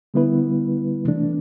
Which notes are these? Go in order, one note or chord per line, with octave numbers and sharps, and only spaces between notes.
D3 G3 B3 E4 B4
C3 E3 A3 D4